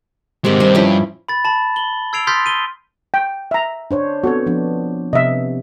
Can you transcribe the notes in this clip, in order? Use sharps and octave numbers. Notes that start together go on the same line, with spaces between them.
G#2 C3 D#3 G#3
G2 C5 G#5
F3 C#4 E4
B5 A6
A5 B5
F#7 G7
E6 G#6 C7 D7 F7
C6 D#6 F6 G6 A6 B6
D#7 G7
G5
E5 A#5
D4 C5 C#5
B3 C4 F#4 A4 C#5
F3 B3 D4
C3 B3 D#5 E5